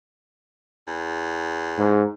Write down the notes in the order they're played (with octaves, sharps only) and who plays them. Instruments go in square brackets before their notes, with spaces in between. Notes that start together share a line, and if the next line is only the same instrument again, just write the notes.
[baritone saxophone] E2
[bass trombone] G#2